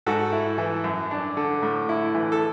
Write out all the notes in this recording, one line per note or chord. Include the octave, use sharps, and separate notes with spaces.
G#2 F#4 A4
E4
E3
F#2
D4
D3
A2
E4
E3
A4